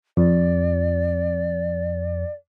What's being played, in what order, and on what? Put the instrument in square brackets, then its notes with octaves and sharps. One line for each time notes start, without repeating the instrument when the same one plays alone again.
[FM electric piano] F2 [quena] D5